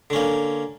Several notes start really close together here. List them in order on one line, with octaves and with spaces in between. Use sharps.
D3 C#4 A#3